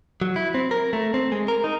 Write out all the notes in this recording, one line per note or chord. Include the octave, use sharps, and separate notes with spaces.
F#3
E4
C4
A#4
A3
C4
G#3
A#4
D#4